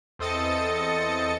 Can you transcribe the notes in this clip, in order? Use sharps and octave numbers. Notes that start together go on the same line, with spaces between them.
E2 C4 A4 D#5 A6 C#7